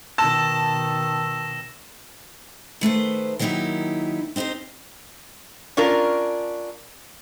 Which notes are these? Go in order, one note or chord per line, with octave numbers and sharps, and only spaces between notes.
B2 D#3 A5 E6 A#6 E7
D#3 A3 B4 C5
D#3 F#3 A#3 D#4 E4 G4
C4 D#4 E4 G4 C5
C#4 D4 F4 A#4